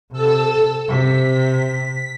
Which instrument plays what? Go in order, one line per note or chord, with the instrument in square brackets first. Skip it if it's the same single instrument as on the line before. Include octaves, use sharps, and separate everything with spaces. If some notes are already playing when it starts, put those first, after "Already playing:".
[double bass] C3 [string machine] A4 E6
[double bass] C3 [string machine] B6